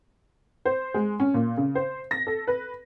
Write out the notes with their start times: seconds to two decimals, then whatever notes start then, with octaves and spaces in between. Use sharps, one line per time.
0.65 C5
0.94 G#3
1.20 C#4
1.34 A#2
1.57 C#3
1.75 C5
2.11 A#6
2.27 A4
2.47 B4